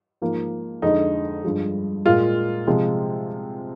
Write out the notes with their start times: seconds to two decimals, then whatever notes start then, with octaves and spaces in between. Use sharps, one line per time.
0.22 G#2 F3 A#3
0.82 F2 D3 G#3 D#4
1.44 G2 F3 G#3
2.05 A#2 G#3 F4
2.67 C3 F3 G#3